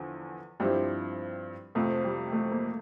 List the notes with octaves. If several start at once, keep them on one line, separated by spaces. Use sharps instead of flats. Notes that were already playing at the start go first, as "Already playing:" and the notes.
Already playing: E2 D3 F3
G2 F3 G3 C4 E4
F2 C3 F3 A3
G3
A3
A#3